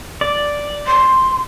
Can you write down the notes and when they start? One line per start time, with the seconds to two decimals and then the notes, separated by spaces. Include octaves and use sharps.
0.21 D5
0.87 C6